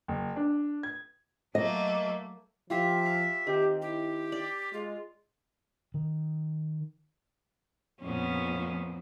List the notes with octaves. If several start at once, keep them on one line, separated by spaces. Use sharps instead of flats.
F#1
D4
G#6
F#3 A3 A#3 D#5
F3 F4 G4 E5 F5
F5
D#3 C4 G4
E4 G4
D5
G#3 F4
D#3
F2 A#2 B3 C#4